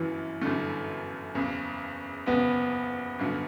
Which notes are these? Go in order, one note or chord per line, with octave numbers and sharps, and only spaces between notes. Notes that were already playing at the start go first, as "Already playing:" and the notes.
Already playing: G1 F#2 E3
G1 F#2 D3 A3
F#1 E2 C#3
F#1 E2 C#3 B3
G1 F#2 D3